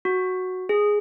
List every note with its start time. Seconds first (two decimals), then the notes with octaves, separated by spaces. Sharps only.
0.05 F#4
0.69 G#4